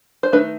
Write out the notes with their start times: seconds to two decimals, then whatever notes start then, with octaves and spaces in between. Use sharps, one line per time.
0.23 C5
0.32 D#3 A3 D#4 B4